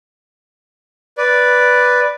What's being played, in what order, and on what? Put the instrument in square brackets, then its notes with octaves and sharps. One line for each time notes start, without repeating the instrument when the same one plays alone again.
[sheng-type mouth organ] B4 D5